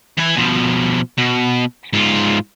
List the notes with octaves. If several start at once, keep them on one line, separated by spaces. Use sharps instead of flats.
E3 G#5
B2 F3
B2
G#2 F4